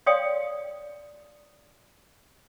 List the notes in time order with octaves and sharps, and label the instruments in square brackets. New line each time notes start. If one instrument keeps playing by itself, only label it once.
[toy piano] C#5 D5 F5 G5 C6 D#6